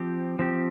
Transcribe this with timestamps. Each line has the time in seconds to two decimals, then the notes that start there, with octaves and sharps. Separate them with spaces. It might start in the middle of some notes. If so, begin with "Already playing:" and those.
Already playing: F3 C4 G4
0.39 F3 C4 G4